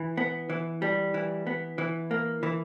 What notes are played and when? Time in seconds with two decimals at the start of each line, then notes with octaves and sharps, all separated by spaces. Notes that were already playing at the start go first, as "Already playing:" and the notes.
Already playing: E3
0.17 B3
0.50 E3
0.82 G3
1.14 E3
1.47 B3
1.78 E3
2.11 A#3
2.43 E3